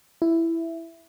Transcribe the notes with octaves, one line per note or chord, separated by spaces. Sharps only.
E4